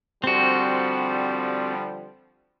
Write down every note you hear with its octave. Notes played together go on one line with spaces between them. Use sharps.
D3 F3 G3 C4 F#4